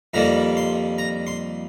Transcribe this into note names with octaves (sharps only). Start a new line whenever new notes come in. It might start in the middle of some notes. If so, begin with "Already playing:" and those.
F2 D#3 G3 A#3 A#5
C6
A#5
C6